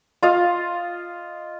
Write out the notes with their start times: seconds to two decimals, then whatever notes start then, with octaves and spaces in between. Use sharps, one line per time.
0.23 F4 D#5 F5